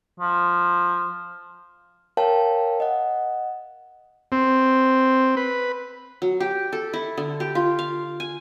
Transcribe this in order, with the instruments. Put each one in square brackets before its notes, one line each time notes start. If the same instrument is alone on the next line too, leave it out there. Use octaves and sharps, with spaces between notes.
[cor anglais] F3
[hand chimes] A#4 C#5 F5 G5 A5
D#5 F#5
[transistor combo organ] C4
B4
[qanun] F#3
G4
A4
E4
D3
G4
F4
F5
G#5